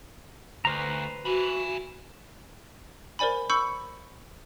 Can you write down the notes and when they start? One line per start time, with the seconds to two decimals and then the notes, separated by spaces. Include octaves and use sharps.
0.65 D2 B4 C5 A#5
1.25 F#4 G#5 B5
3.19 A#4 C5 D5 G#5 B5
3.50 B5 C#6 E6 G6 C#7